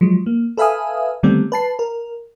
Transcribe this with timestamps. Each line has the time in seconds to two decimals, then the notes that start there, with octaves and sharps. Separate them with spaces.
0.01 F3 F#3 G#3
0.26 A#3
0.57 A4 B4 E5 F5 G#5 D#6
1.23 D3 D#3 G3 A3 B3 C4
1.52 B4 A5 C7
1.79 A#4